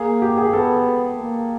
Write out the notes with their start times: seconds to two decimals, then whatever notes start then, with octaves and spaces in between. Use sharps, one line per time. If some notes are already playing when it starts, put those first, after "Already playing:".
Already playing: A#3 G#4
0.22 G4
0.37 G#4
0.53 B3 A4
1.18 A#3